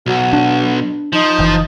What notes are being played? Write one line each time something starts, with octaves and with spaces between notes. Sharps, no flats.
B1 F#4
D4
F3 D#4
F#1 E3